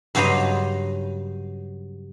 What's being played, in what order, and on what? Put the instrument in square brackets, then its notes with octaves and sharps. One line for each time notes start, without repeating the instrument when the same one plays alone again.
[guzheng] G2 C#3 F#3 C5 D#5 A#5